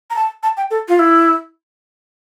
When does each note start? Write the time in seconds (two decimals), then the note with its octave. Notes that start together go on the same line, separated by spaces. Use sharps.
0.10 A#5
0.16 A5
0.43 A5
0.57 G5
0.71 A4
0.88 F4
0.99 E4